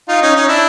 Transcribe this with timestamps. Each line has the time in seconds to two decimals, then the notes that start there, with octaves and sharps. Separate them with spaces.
0.08 D#4 F4
0.22 C#4 D#4
0.36 C#4 D#4
0.48 D4 E4